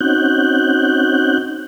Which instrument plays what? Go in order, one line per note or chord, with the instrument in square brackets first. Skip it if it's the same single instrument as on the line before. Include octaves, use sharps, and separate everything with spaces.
[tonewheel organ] C4 C#4 D#4 F#4 F#6 G6